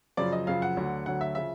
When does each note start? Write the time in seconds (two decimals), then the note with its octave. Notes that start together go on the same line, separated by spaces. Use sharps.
0.17 F#2 C#3 F3 D5
0.32 D#5
0.47 F#2 C#3 F3 F5
0.62 F#5
0.77 D2 D3 F#3
1.06 D2 D3 F#3 F#5
1.21 E5
1.35 C#3 F3 E5